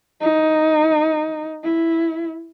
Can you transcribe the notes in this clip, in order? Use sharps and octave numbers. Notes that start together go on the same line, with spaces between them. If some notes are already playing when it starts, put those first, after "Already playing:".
D#4
E4